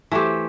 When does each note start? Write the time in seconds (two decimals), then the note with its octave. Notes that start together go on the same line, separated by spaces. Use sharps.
0.12 E3 A3 C4 G4